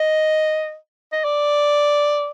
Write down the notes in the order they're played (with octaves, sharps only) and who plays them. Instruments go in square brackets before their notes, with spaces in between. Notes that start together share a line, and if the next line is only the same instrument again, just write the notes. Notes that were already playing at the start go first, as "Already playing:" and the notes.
Already playing: [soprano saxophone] D#5
D#5
D5